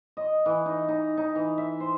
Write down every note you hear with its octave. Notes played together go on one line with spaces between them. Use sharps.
D#5
E3
D#4
D#4
D#4
E3
E5
C5